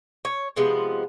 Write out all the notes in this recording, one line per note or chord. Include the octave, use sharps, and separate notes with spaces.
C#5
C3 F3 G#3 B3